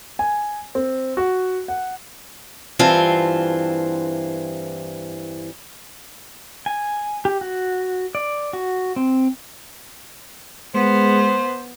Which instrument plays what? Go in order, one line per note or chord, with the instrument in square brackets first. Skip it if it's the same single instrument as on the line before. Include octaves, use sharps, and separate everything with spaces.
[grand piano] G#5
C4
F#4
F#5
[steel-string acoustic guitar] G2 E3 C4 F4 E5 A5
[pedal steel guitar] G#5
G4
F#4
D5
F#4
C4
[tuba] G#3 [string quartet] B3 [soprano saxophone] C5